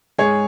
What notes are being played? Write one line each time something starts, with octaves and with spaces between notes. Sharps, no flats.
G#2 G#3 G#4 C#5